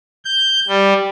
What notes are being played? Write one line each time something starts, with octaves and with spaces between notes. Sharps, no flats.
G6
G3